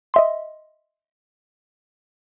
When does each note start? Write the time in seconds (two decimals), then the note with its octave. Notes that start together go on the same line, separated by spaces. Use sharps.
0.14 D#5 E5 C6